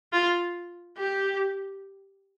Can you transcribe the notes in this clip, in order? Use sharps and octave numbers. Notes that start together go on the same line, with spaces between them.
F4
G4